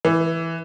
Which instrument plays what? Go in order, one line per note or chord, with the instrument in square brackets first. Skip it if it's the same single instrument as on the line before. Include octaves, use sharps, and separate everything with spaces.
[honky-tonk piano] E3